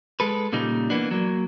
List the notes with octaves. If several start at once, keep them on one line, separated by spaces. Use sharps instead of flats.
G#3 A4 B4
A#2 C#3 G3 D#4
E3 A#3 B3 D4
F#3 A#3